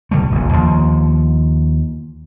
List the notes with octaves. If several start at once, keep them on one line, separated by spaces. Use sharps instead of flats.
D#1 D3 G3 A3
F1 A#1
D#2 F3